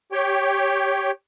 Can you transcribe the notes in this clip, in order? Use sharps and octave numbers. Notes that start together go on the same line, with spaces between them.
G4 C#5 G5